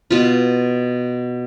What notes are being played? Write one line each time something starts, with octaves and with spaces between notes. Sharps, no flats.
B2 F4